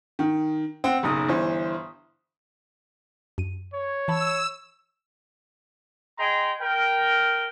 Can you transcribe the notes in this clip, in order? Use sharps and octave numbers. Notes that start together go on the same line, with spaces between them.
D#3
C4 F#5
F#1 B1 F#2 D#4 D#6
G1 E3 C5
F#2 D#7
C#5
E3 A5 B5 E6
G#4 D#5 G5 A#5 C6
A#4 G5